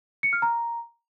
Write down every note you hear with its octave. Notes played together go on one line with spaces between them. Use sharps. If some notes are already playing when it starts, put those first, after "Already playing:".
C#7
F6
A#5